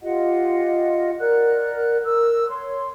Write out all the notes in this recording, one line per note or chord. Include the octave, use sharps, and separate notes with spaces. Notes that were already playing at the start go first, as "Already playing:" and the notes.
F4 G4 D#5 F#5
A#4 D5 F#5 F#6
A#4 E6
C#5 C6